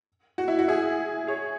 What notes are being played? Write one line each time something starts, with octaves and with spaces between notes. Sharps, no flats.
F#4
E4
F#4
E4 G#4
G#4 C#5